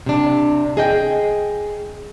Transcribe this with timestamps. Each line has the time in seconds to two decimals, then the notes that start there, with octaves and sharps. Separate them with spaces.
0.06 C3 D4
0.77 G#4 D#5 G5